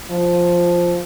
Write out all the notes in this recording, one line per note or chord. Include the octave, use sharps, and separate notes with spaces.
F3